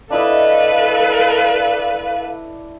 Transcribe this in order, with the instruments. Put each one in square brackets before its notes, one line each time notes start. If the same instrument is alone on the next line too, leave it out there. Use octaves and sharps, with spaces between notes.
[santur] D4 E4 D#5 [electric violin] A4 B4 [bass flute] F5